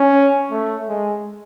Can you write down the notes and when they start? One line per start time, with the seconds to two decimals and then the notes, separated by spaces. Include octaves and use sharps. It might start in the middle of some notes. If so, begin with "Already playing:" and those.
Already playing: C#4
0.51 A3
0.89 G#3